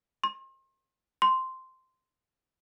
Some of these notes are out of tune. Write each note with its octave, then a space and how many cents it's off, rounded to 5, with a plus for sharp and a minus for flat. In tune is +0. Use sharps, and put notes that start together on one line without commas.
C6 +40
C6 -5